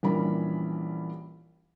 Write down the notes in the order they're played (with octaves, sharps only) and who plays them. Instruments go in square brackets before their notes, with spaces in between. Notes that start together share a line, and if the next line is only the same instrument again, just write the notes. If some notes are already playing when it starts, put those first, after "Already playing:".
[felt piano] A#1 E3 G3 C#4 A#4 B5